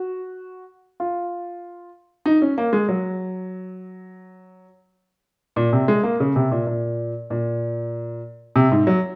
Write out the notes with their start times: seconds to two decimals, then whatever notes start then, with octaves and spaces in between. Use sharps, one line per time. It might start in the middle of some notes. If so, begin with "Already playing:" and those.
Already playing: F#4
1.00 F4
2.26 D#4
2.42 C#4
2.58 A#3
2.73 G#3
2.88 F#3
5.56 A#2
5.73 C3
5.88 G#3
6.03 A#3
6.20 C#3
6.36 C3
6.51 A#2
6.67 A#2
7.30 A#2
8.56 C3
8.71 G#2
8.87 F#3